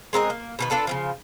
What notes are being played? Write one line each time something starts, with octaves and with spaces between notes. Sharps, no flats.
G#3 C4 A#4 D#5
A#3
B2 D#3 B4
D4 F4 A4 B4
C#3 E3 F3